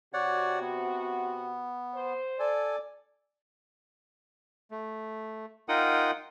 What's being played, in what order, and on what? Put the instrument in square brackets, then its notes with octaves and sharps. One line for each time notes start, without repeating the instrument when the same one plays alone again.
[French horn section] C3 F#4 [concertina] C#5 D5 F#5
[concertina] B3
[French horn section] C5
[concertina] A4 G#5 [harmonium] D5
[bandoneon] A3
D#4 F4 A#4 F#5 G5 D#6